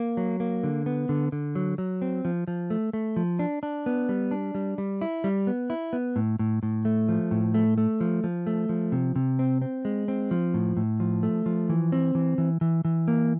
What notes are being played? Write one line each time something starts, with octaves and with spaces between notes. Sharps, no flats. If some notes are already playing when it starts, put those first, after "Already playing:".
Already playing: A#3
F#3
A#3
D3
B3
D3
D3
F#3
F#3
C4
F3
F3
A3
A3
F3
D4
D4
B3
G3
D4
G3
G3
E4
G3
B3
E4
B3
A2
A2
A2
A3
F3
A2
A3
A3
F3
F3
A3
F3
C3
C3
C4
C4
G#3
C4
F3
A2
A2
F3
A3
F3
E3
C4
E3
E3
E3
E3
A#3